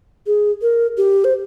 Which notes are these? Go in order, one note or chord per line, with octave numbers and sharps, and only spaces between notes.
G#4
A#4
G4
C5